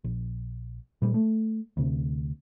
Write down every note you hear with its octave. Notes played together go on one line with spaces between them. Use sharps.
A#1
A#2 G3
A3
D2 C3